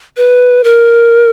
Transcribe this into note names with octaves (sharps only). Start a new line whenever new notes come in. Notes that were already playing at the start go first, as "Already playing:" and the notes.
B4
A#4